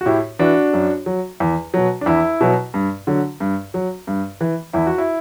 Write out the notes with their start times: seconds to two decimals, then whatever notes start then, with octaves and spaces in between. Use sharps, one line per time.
0.01 F#4
0.06 A2 E4 G4
0.39 E3 D4 F#4
0.73 F#2
1.06 F#3
1.40 E2
1.74 B2 F#3
2.01 D4
2.06 E2 E4
2.41 B2 F#3
2.74 G2
3.07 D3 F#3
3.40 G2
3.74 F#3
4.07 G2
4.41 E3
4.73 E2 E4
4.87 F#4
4.98 E4